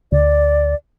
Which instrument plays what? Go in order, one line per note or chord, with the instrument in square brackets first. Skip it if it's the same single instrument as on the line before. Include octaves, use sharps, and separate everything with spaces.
[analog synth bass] D2 [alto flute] D5